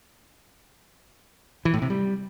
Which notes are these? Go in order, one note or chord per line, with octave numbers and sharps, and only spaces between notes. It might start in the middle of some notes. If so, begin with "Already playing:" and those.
E3
A2
C3
G3